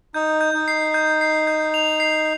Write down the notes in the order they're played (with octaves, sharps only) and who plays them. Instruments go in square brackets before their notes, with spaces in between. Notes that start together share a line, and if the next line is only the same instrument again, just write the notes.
[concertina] D#4 [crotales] G6
[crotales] G6
[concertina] D#4
[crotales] C7
G6
C7
G6
F7
C7